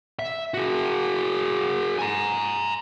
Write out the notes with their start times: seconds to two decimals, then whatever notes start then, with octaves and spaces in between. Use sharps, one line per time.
0.19 E5
0.54 F#4 G#4
1.99 G#5 A#5